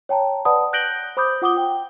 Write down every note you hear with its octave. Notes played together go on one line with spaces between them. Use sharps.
C#5 G5 A5 A#5
B4 D5 F#5 A5 B5 D#6
F#6 G6 A#6 D7 F#7 G7
C5 B5 D6 D#6 G6
F4 F#5 D6 D#6 G7
G5